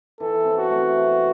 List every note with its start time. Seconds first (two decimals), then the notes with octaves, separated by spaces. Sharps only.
0.20 E3 A4
0.45 C4
0.58 F#4
0.70 A3
0.95 C3